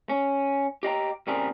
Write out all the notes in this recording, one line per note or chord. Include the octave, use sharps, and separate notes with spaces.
C#4
G4 D#5 G5 A#5
A#2 C#3 G3 C4 G#4 A#4